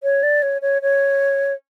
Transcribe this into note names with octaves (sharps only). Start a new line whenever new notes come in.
C#5
D5
C#5
C#5
C#5